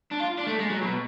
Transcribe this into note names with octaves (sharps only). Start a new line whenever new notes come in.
D4
F4
D4
A3
G#3
F#3
B2